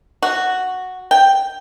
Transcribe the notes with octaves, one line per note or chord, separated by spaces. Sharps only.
F#4
G5